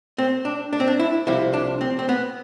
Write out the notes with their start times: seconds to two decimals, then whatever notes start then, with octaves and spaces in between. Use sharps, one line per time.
0.18 C4
0.45 D4
0.73 D4
0.80 C4
0.87 D4
0.99 E4
1.27 C2 C3 F3 E4
1.53 D4
1.81 C4
1.99 C4
2.09 B3